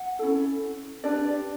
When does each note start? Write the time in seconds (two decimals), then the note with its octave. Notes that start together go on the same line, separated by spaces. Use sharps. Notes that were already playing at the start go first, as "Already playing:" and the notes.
Already playing: F#5
0.19 C#4 E4 A4
1.04 D4 G4 B4 D5